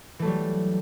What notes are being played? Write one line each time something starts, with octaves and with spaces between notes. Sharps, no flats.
E3 F#3 G3 A3